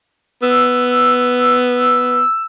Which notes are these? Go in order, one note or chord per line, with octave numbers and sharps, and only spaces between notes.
B3 E6